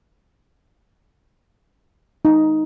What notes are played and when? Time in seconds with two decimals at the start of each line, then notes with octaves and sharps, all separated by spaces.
2.25 D#4